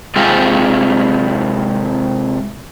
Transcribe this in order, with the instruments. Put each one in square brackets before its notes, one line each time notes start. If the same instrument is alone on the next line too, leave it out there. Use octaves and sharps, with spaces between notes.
[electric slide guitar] C3 G#3 C4 F4 G4